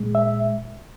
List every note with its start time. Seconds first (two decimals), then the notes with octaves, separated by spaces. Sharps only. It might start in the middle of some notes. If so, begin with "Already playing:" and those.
Already playing: A#2 G#3
0.15 E5